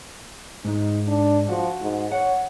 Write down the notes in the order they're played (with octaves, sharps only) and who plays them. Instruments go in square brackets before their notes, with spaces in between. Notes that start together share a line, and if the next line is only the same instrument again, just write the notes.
[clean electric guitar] G#2 G#3 [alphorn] D#4
[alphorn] D4
[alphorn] F3 [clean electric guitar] F#4
[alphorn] G#2
[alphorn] C#5 [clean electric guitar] F#5